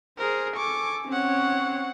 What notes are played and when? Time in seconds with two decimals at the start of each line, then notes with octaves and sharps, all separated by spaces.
0.18 G#4 A#4 C5
0.56 A4 G#5 C#6 D6
1.08 C4 C#4 C#5 F#5